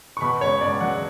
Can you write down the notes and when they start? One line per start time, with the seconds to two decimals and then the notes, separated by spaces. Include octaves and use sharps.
0.17 C#6
0.21 B2 B5
0.41 C#2 C#5
0.61 C#2 D5
0.80 F#3 F#5